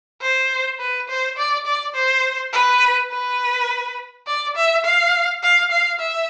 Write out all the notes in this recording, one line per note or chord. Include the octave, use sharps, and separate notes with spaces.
C5
B4
C5
D5
D5
C5
B4
B4
D5
E5
F5
F5
F5
E5